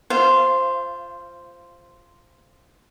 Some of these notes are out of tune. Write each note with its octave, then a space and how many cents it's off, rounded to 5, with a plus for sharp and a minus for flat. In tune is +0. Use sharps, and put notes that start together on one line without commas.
F4 -10 C5 +0 F5 -30